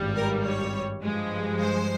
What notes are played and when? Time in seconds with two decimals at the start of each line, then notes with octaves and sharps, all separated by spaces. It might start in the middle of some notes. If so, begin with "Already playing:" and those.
Already playing: G#1 G2 G3
0.16 A#4
0.44 C#5
1.03 G2 F3 G#3
1.61 C5